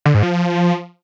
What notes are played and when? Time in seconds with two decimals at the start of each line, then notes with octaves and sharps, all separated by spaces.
0.05 D3
0.14 G#2
0.23 F3